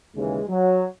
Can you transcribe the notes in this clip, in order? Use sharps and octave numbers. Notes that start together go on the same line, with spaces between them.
D#2 C#3 E3 G#3
F#3